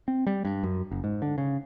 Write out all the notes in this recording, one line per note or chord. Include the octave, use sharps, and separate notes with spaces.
C4
G3
G2
F#2
F#1
G#2
D3
C#3